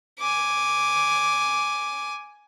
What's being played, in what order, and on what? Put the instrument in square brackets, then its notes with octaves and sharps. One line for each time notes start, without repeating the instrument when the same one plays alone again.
[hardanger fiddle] G#5 D6